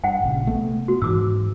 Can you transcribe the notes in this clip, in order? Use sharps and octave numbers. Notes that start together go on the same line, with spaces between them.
G2 F#5 G5
A#1 C#3
C3 A3 B3
B3 F#4
G#2 E3 D6 E6